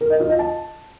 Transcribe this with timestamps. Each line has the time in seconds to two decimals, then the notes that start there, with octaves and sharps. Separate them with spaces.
0.01 A#4
0.10 D#5
0.20 F4
0.29 D#5
0.39 A5